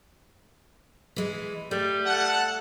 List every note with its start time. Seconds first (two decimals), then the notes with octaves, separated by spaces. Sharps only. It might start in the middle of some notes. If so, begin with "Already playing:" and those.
1.16 E3 G#3
1.71 G3 A3
2.06 A4 F#5 A5